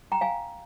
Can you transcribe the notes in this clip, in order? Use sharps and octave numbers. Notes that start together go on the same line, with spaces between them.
G5 A#5
F5 G#5